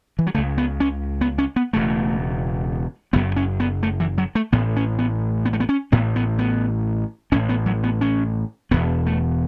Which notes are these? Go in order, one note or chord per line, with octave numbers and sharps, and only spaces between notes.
E3
F#3
C#2 C#3 A3
B3
C#4
B3
C#4
B3
E1 E2 C#3 A3
F#1 F#2 C#3 B3
C#4
B3
A3
E3
F#3
A3
A1 A2 B3
C#4
B3
B3
A3
B3
C#4
A1 A2 B3
B3
B3
A1 A2 C#4
B3
F#3
B3
C#4
E1 E2 B2 B3
A3